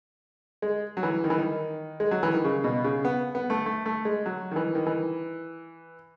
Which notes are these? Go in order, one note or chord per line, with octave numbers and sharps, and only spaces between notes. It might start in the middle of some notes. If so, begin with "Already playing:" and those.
G#3
F#3
E3
D#3
E3
D#3
G#3
F#3
E3
D#3
C#3
B2
C#3
B3
B3
A3
A3
A3
G#3
F#3
D#3
E3
D#3
E3